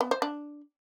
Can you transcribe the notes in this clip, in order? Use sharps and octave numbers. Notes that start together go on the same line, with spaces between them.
B3
C5
D4